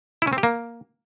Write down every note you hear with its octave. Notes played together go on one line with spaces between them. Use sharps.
E4
C#4
C4
G4
A#3